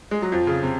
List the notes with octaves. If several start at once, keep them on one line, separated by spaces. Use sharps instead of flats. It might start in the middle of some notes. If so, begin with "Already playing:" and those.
G#3
F#3
F2 F3
C#3
C3